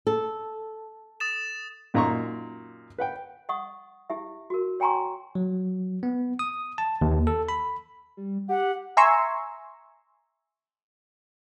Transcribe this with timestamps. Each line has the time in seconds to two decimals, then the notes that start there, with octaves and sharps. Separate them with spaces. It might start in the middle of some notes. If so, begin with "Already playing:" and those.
0.07 A4
1.20 D#6 A6 E7
1.94 F#2 A#2 D#4 A#5 C6 C#6
2.98 B4 F#5 G5
3.49 D#5 F#5 C#6 D#6
4.10 E4 G4 E5
4.50 F#4 A#4
4.80 C#5 G5 G#5 A#5 C6 C#6
5.35 F#3
6.03 B3
6.39 D#6
6.78 A5
7.01 D#2
7.27 A4
7.49 B5
8.17 G3
8.49 G4 F#5
8.97 E5 G#5 A#5 C6 C#6 E6